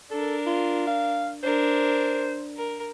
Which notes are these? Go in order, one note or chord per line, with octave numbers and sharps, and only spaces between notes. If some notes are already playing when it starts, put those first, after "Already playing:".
D4 A4 A#4
F4
F5
D4 A#4 C5
A#4